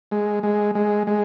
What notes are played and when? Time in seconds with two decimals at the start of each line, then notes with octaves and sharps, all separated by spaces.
0.11 G#3
0.43 G#3
0.75 G#3
1.07 G#3